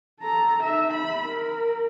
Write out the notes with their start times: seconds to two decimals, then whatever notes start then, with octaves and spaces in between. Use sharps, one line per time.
0.20 A4 A#5
0.63 D#4 E5
0.93 B5
1.25 A#4